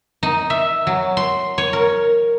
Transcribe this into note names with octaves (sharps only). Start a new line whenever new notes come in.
D#4
E5
F#3
C6
C#5
A#4